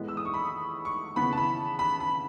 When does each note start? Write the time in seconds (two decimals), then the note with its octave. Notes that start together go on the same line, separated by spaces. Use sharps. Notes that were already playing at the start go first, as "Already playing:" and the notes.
Already playing: A2 E3 G#3 B3
0.08 E6
0.17 D#6
0.25 C#6
0.34 B5
0.85 C#6
1.16 C#3 E3 B3 B5
1.32 A5
1.38 B5
1.79 B5
2.00 B5